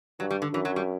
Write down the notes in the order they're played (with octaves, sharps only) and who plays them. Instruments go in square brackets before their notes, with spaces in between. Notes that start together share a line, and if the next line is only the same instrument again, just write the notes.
[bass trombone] G2 [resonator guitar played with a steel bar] F#3
[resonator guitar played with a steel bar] G3
D3
[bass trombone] F#2 [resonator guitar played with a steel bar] E3
[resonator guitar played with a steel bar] F#3
G3